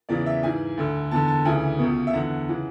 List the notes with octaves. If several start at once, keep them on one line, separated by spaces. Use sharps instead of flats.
E2 C#3 E3 D5
E5
G#2 E3 G#5
D2 D3
E2 D3 A5
A5
D2 C#3 E3 G#5
C#2 B2
E5
E2 D3 F#5
C#3 E3